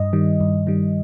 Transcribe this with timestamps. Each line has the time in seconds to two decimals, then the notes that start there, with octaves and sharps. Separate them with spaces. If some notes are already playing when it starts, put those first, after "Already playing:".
Already playing: G2 D#5
0.13 D#3 G3
0.40 G2
0.67 D#3 G3